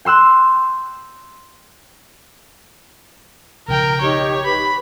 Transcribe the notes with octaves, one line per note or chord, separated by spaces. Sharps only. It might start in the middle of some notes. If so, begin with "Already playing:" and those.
G5 C6 E6 F#6
B1 C#3 F3 A#4 G5 A#5
D#4 G4 C#5
B4 B5